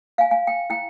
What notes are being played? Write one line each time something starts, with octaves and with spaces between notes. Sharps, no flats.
F5 G#5
F5 G#5
G5
E4 G5